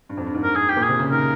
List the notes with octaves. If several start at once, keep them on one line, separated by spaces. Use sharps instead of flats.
G2
F2
G2
G#2
A#4
G#4
G4
A#2
G#4
C3
C#3
D#3 A#4